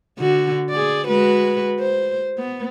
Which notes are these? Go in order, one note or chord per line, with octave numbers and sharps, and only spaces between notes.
D3 F#4
G#4 D5
G#3 F#4 B4
C5
B3